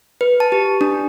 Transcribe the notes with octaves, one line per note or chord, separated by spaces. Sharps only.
B4
A5
G4
D4